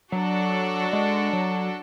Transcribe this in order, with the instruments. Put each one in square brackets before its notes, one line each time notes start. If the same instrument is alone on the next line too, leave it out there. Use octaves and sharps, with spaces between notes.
[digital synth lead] F#3 [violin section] D4 F#4 A4 D5
[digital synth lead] G#3
F#3